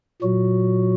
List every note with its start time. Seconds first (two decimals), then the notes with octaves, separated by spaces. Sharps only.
0.21 A#2 F#3 F#4